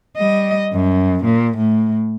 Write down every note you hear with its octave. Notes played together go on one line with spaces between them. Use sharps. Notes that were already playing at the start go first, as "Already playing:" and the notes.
G3 D#5
F#2
A#2
A2